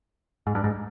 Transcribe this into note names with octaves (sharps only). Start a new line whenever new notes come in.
G#2
G2
G#2